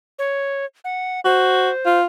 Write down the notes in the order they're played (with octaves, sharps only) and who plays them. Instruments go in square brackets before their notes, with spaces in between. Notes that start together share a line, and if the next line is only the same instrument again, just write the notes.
[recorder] C#5
F#5
[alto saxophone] F#4 [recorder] C5
[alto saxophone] F4